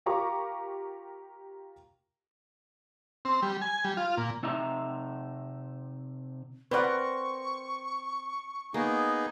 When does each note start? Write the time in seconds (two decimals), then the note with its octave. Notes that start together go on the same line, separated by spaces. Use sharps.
0.06 F4 G4 A#4 A#5 C#6 D6
3.25 C4
3.42 G3
3.62 G#5
3.84 G3
3.97 F4
4.17 A#2
4.43 C3 D#4 E5 A#5
6.71 C4 A#4 B4 D5 F#5 C#6
8.74 A#3 B3 D#4 G#4